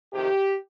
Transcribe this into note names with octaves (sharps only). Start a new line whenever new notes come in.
F2 C3 D#3 G4